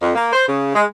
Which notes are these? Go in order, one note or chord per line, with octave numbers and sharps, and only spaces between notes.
F2
A#3
C5
C#3
G#3